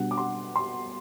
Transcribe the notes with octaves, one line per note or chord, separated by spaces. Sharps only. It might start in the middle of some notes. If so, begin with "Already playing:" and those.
Already playing: B2 G3 D4 F#5
D6
C6
C6